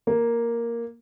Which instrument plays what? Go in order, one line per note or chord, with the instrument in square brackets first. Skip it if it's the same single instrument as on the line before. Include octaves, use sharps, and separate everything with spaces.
[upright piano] A#3